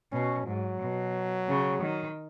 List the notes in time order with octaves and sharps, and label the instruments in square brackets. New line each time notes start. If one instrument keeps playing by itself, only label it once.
[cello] B2 [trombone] C#4
[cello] G#2 [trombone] F#3
[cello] B2
C#3
D#3